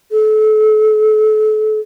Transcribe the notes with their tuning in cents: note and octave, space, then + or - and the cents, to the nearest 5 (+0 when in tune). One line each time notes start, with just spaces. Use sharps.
A4 -35